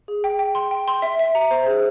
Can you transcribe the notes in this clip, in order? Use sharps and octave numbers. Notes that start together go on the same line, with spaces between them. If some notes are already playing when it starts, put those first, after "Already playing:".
G#4
G5
G5
C6
G5
C6
E5
E5
A#5
C5
G#4